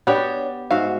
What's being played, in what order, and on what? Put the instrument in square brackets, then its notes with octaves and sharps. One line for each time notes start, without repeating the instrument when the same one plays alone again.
[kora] B3 G4 [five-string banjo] D4 C#5
[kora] G#2 F#4 E5 [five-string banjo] F5